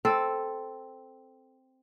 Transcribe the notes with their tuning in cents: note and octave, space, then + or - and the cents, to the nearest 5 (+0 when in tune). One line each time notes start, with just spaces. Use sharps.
C4 +0 A4 +0